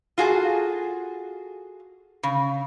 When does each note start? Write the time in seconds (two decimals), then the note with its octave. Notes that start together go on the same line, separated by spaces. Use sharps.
0.18 F4 F#4 G#4 A4
2.23 C#3